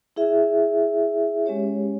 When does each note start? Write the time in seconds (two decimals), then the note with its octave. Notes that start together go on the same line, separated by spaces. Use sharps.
0.16 E4 G#4 E5
1.46 G#3 C#4 G4 C#5